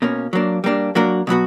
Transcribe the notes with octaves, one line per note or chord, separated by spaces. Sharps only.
B2 A#3 C#4
F#3 A#3 D4
G3 A#3 D4
F#3 A#3 D4 F#4 A#4
B2 F#3 B3 F#4